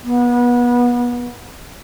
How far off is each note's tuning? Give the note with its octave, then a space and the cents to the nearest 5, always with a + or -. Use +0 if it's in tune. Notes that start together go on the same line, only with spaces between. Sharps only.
B3 -25